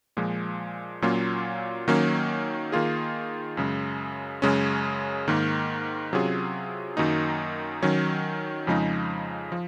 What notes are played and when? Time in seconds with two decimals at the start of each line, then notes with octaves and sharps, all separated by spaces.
0.17 A#2 F3 G#3
1.02 A#2 F#3 A#3 C#4 F4
1.88 D#3 F#3 A#3 C#4
2.72 D#3 A#3 F4 G#4
3.57 F#2 C#3 G#3
4.42 F#2 C#3 G#3 C#4
5.28 G#2 D#3 A#3
6.13 C3 F#3 C#4 F4 G#4
6.97 F#2 D#3 F#3 A#3 D#4
7.82 D#3 F#3 C#4
8.67 F2 C#3 F3 G#3 D#4
9.52 F3